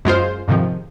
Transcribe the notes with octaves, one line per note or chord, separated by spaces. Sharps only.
F#2 G#3 F4 C5
F2 G#2 C3 D#3 F3